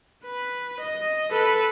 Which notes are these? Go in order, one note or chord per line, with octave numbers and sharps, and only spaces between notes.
B4
D#5
A4 B4